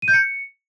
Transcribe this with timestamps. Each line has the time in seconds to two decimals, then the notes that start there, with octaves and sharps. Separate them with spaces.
0.02 D#7
0.08 G6
0.13 C#7